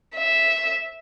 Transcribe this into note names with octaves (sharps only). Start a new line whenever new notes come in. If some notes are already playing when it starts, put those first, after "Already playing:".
E5